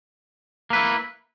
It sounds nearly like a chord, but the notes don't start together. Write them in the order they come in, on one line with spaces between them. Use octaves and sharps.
A#3 B4 E4